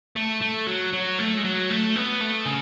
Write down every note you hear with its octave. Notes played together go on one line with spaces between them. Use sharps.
A3
A3
F#3
F#3
A3
G#3
F#3
A3
B3
A3
C#3